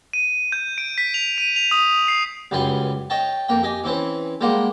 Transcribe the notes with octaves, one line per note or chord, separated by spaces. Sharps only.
D#7
G6
D7
B6
F7
D#7
F7
D#6
C7
C#2 F#2 G3 B4 G#5 C6
C#5 D#5 G5 A5
F2 A#3 G5
G4 D#5 G#5
E3 C4 C#4 B4
G3 G#3 A#3 C5 F#5